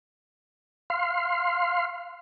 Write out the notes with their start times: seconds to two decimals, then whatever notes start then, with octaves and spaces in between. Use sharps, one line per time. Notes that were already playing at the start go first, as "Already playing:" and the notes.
0.90 F5 C6